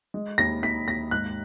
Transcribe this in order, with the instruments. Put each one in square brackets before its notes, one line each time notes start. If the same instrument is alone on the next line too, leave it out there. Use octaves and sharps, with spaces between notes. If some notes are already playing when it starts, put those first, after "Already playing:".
[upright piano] G#3
D#2 A#6
D#2 B6
D#2 A#6
G#2 F#6